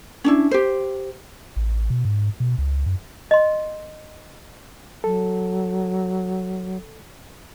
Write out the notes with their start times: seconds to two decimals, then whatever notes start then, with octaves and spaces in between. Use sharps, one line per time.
0.24 C#4 D4 E4
0.51 G4 C5
1.56 A1
1.90 B2
2.05 G#2
2.40 B2
2.58 C#2
2.86 F#2
3.31 D#5 C6
5.04 F#3 A4